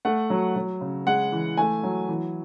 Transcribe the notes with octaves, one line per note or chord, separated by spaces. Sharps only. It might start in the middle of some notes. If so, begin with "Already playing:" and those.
A3 F#5
F#3
F#3
C#3
G#3 F#5
E3
A3 G#5
F#3
E3